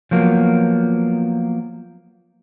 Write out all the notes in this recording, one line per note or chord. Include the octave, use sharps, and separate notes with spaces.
F3 F#3 A#3 B3